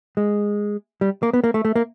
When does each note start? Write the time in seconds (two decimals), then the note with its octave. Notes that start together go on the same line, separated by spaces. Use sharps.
0.17 G#3
1.01 G3
1.23 A#3
1.33 B3
1.44 A#3
1.54 A3
1.65 A3
1.75 A#3